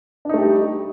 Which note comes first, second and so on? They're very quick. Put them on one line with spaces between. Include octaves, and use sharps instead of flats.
D4 D#4 A3 G4 G3